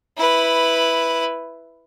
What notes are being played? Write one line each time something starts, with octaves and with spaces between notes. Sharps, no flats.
E4 B4